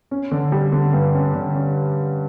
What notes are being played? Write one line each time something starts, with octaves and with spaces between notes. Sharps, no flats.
C#4
D3
G3
D3
G2
C#4
D3
C#4